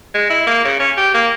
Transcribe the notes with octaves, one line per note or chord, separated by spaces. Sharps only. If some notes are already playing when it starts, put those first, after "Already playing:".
G#3
E4
A#3
C#3
C#4
G4
A#3